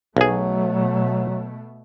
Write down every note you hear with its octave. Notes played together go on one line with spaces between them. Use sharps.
B1 B2 F#3 A3 G#4